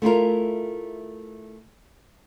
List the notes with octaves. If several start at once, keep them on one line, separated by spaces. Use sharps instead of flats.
A3 E4 F4 A#4